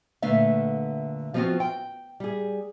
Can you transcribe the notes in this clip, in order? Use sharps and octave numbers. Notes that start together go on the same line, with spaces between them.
A#2 D3 A3 B4 E5 F5
F3 G3 B3 C4 F4 F#4
G5
G3 G#4